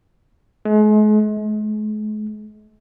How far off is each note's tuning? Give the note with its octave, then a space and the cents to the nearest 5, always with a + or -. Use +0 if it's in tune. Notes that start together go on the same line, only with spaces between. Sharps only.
G#3 +40
G#3 +45